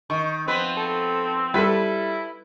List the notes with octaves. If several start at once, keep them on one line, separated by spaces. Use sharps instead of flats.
D#3 C#6
F3 B3 C4 B4
A4
G3 E4 A4 B4